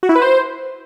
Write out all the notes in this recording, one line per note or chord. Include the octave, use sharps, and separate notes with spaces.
F#4
E4
B4
C5